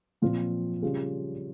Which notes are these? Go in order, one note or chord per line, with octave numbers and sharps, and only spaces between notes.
A#2 F3 C4 F4
C#3 G3 C#4 F4 G#4